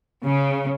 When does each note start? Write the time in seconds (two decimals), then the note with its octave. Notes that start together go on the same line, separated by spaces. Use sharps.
0.25 C#3